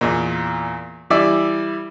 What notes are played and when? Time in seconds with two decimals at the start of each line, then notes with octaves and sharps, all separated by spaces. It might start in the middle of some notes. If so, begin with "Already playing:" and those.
0.01 E2 A#2
1.10 E3 G3 D5 E5